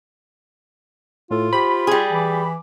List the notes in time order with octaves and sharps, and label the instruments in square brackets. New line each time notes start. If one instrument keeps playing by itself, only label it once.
[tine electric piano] A2 A4 [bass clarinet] F4
[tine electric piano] G4 C5 [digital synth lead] B5
[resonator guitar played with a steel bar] G3 G#4
[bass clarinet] E3 [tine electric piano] G#5 D6